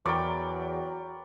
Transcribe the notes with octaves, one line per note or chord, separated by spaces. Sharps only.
E2 F#3 A#4 D5 G5 B5 C#6